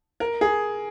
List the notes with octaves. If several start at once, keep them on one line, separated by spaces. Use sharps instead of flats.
A#4
G#4